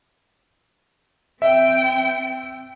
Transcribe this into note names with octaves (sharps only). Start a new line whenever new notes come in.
C4 E5 G5